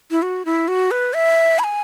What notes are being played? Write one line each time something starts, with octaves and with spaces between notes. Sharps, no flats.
E4
F#4
E4
F#4
B4
E5
B5
G#5